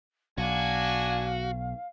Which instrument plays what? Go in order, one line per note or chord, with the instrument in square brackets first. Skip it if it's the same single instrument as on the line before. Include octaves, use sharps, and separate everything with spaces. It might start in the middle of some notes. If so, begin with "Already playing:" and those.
[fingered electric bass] B1 [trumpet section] D4 G#5 [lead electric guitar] F#4 [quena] F5